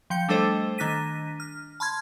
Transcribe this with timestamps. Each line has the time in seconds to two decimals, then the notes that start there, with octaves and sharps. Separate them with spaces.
0.10 F3 G5 G6 C#7
0.28 G3 A3 D4 A4 C5 D#5
0.78 D#3 D4 F#6 A#6 B6 D#7
1.40 F6
1.80 A5 B5 C6 F6 G#6